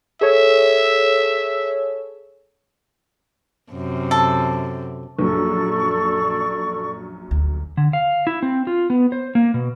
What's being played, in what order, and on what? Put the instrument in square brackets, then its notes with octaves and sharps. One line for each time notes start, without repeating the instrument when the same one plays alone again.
[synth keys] G#4 A4 C#5 [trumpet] E5
[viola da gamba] F#2 C3
[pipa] A4
[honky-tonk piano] A#1 F#2 [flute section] A4 D5 C#6
[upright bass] D2
[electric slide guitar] D3
F5
E4
C4
F4
B3
C5
A#3
B2